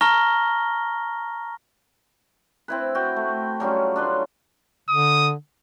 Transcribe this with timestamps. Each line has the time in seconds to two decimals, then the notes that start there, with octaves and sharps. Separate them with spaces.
0.01 A5 A#5 C#6 F6 A#6 G7
2.68 C4 E4 B4
2.95 F#4 G5
3.16 A3
3.60 F#3 G3 C#4 F4
3.96 D4 B4 C6
4.89 D3 D#6